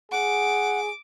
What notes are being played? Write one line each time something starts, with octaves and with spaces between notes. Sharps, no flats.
G#4 F#5 D6